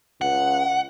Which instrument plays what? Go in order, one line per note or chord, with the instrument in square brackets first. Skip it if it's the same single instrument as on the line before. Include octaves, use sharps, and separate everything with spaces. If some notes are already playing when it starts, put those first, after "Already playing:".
[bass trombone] C#2 [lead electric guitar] F#5